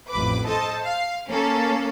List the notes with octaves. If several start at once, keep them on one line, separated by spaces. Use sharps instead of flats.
A1 F2 B4 D6
A4 C5 D#5 A5
F5
A#3 C#4 A4